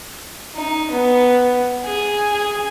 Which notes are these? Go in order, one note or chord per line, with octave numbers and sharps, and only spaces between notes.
D#4
B3
G#4
G#4